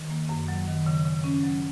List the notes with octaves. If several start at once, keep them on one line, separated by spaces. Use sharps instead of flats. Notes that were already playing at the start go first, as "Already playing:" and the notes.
Already playing: D#3
A#3
F#2
F#3
D#3
C#3
C#3
C#4
F#3